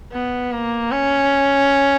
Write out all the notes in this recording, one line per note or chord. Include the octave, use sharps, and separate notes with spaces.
B3
A#3
C#4